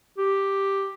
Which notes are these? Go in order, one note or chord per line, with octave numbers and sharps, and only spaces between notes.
G4